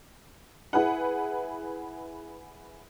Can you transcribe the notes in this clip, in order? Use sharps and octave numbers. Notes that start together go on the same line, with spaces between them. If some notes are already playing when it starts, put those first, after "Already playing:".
E4 G#4 B4 F#5